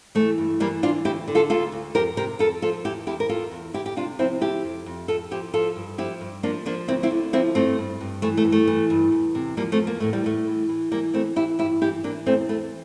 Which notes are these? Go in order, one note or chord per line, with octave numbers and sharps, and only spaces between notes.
E3 A3
G2
E3 G3 A#3
E3 D4 F4
D2 E4 G4
D3
F4 A4
D2 F4 A4
D2
F2 G4 A#4
C3 G4 A#4
F2 F4 A4
F3 F4 A4
E2 E4 G4
E2 E4 G4
A#4
E2 F4 A4
E2
D2 E4 G4
G4
C3 D4 F4
F3 C4 E4
D2 E4 G4
F2
F2
F2 F4 A4
F3 E4 G4
F3 F4 A4
G2
F3 E4 G4
G2
F3 A#3 D4
F3 A#3 D4
D2 C4 E4
C4 E4
D3
F3 C4 E4
G2 A3 C4
G2
G2
E3 A3
A3
G2
A3
E3
G2
E2
C3
F3 G3 A#3
A3 C4
E2
A#3
A2 A3
G3
A2 A3
E3
E3
E3 G3 A#3
E3 A3 C4
E3 E4 G4
G2 E4 G4
E3 E4 G4
E3 A#3 D4
E2 A3 C4
E3 A3